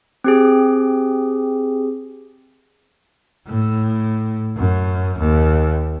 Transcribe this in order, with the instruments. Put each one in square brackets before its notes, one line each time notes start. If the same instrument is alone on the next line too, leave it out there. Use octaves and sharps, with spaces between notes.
[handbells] C4 G4 G#4
[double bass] A2
F#2
D#2